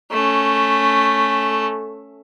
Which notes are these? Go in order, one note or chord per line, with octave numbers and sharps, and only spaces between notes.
A3 C#4